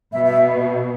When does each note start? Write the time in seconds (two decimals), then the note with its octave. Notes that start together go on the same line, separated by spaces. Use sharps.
0.13 B2 E5
0.25 E5